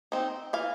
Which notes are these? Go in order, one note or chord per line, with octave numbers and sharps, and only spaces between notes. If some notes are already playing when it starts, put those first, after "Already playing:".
C4 D#4
E3 F5